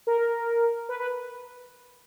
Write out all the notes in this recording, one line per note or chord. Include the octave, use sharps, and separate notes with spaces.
A#4
B4
B4